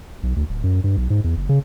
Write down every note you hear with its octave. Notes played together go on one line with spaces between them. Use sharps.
B1
D2
D1
F#2
G2
B1
G#2
E2
F#1
C#3